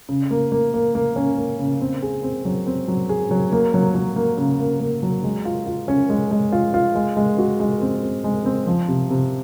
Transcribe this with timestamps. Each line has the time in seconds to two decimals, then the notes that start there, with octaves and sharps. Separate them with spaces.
0.09 C#3
0.31 A#3
0.52 A#3
0.74 A#3
0.95 A#3
1.16 C#4
1.38 A#3
1.59 C#3
1.81 C4
2.02 G#4
2.23 C4
2.45 F#3
2.67 C4
2.88 F#3
3.09 G#4
3.31 F#3
3.52 A#3
3.74 F#3
3.95 F#3
4.16 A#3
4.37 C#3
4.60 A#3
4.80 A#3
5.03 F#3
5.24 G#3
5.45 F4
5.66 F4
5.88 C#4
6.10 G#3
6.31 G#3
6.52 F4
6.74 F4
6.95 G#3
7.17 G#3
7.38 F#4
7.60 G#3
7.82 C4
8.02 C4
8.24 G#3
8.45 C4
8.67 F3
8.88 C3
9.10 C3